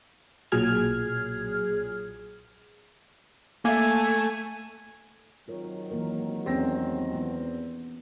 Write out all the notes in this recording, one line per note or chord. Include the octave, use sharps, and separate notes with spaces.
B1 A#2 F#3 G#4 F6 G#6
A3 A#3 E5 G#5
G#1 D#3 F#3 F4 A#4 C#5
E3 A#3 A#4
E2 C4 C#4 G4 A#6
E3 B3 E4